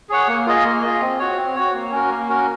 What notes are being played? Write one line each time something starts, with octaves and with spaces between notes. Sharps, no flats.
G#4 C#5 F#5
A#3
F4 G#4 D#5
A#3
F4 G#4 D#5
C4
F#4 C#5
C4
F#4 C#5
A#3
C#4 F#4 A#4
A#3
C#4 F#4 A#4